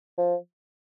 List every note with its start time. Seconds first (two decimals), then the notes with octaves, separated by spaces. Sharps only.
0.18 F3